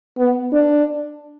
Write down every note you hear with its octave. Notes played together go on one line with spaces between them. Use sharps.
B3
D4